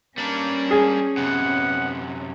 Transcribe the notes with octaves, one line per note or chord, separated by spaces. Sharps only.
G3 A#3 C#4 D4
G#4
F#2 C3 B3 F#5